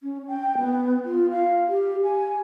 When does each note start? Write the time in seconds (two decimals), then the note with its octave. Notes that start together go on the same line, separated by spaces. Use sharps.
0.03 C#4
0.28 G5
0.57 B3
1.05 F4
1.31 F5
1.69 G4
2.03 G#5